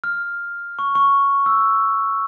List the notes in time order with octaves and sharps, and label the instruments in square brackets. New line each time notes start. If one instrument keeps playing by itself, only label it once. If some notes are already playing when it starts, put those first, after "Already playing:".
[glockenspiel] F6
C#6
C#6
E6